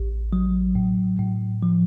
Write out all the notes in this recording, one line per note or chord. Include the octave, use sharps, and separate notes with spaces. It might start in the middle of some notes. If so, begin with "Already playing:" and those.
Already playing: A1
F#3
A2
A2
F3